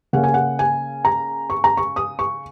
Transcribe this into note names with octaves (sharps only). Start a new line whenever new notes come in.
C#3 A#3 C#4 F#5
G#5
F#5
G#5
A#5
C#6
A#5
C#6
D#6
C#6